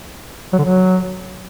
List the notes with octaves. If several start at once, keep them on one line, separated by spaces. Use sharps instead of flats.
F#3
D3
F#3